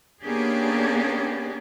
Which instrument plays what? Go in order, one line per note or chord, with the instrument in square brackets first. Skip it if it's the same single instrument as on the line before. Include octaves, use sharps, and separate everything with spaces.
[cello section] A#3 B3 C#4 D4 G4 G#4